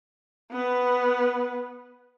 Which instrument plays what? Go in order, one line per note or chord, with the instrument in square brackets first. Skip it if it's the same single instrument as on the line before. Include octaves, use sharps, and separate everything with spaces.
[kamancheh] B3 B4